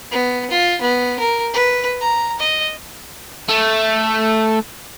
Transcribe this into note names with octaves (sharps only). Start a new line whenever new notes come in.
B3
F4
B3
A#4
B4
A#5
D#5
A3